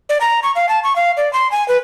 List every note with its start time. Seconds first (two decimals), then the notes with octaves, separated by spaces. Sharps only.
0.09 D5
0.21 A#5
0.43 C#6
0.56 F5
0.69 A5
0.84 C#6
0.96 F5
1.17 D5
1.33 C6
1.52 G#5
1.68 B4